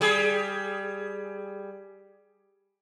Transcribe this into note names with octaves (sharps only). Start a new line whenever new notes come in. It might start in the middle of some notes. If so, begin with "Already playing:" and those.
G3 G#4